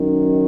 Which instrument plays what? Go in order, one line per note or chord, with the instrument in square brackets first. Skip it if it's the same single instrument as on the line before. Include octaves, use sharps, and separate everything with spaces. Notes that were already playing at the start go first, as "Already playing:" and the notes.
Already playing: [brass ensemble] F#2 D#3